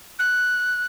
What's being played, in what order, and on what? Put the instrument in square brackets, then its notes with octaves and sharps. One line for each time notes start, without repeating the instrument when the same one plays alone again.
[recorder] F#6